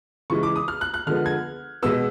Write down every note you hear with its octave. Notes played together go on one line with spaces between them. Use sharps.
C#3 E3 G#3 C#6
D6
D#6
F6
F#6
F#6
D3 F3 G#3 B3 F6
G#6
B2 G#3 B3 E6